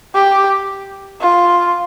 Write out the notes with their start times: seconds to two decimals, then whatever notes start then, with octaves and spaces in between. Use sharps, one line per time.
0.14 G4
1.21 F4